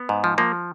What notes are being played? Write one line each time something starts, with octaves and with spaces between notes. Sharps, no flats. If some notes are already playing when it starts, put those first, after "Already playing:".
Already playing: B3
G#2
F3
F3 A#3